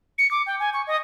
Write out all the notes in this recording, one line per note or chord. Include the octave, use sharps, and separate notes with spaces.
C#7
D6
G5
G#5
C#6
D#5